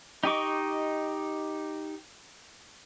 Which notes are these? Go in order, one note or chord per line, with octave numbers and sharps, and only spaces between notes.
D#4 G4 D#5 C#6 D6